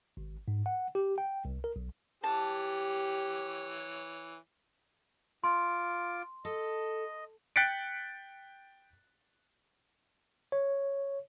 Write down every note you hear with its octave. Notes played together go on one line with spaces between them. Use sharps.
G#1
G#2
F#5
G4
G5
C2
A#4
B1
E3 G4 C#5 A5
F4 C6 D6
A4 D#5
G5 F#6 A6 B6 C#7 D7
C#5